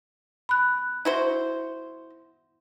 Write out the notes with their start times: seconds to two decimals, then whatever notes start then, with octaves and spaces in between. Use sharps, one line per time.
0.49 B5 F#6
1.05 E4 F#4 C5